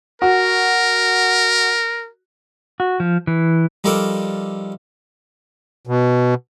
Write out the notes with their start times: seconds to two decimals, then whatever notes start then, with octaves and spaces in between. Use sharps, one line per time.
0.22 F#4 A#4
2.80 F#4
3.00 F3
3.27 E3
3.84 F3 G3 D#4 A4 A#4 D5
5.87 B2